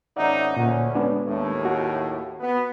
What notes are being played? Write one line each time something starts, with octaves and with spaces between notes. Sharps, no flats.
G#1 C#4 D#4 D5 E5 F#5
D2 A#2 C#4 F#5
G#3 B3 D4
D#2 A2
F#4
B3